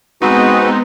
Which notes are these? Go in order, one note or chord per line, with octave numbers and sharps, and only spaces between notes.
G#3 B3 C4 D#4 F#4 B4